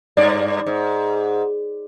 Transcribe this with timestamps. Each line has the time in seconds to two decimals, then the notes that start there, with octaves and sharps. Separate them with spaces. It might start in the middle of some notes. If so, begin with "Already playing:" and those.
0.17 G2 D5
0.66 G#2